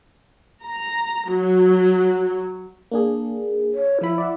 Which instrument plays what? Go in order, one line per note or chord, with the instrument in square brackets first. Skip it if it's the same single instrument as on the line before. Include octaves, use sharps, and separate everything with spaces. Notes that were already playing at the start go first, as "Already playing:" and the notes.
[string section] A#5
F#3
[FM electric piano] A#3 D4 G#4
[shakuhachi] C#5
[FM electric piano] F3 B5 [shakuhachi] E4
[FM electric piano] D5 E5 F#5